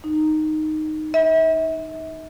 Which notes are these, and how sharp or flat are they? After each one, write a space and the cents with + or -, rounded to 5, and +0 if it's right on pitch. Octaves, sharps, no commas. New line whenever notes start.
D#4 -5
E5 -40